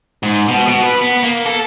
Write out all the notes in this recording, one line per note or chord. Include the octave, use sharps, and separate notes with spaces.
G#2
B2
B2
B4
B3
A#3
A4